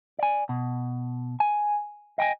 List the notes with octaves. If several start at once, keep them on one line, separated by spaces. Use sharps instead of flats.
D5 G#5
B2
G#5
D#5 G5 G#5